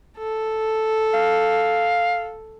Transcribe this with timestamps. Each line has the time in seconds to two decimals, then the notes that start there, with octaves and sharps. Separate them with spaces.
0.18 A4
1.14 F5